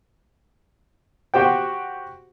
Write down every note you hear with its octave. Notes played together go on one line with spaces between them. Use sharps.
F#4 G4 C5 G5